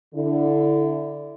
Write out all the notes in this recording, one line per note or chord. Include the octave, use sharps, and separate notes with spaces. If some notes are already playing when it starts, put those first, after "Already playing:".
D3 E4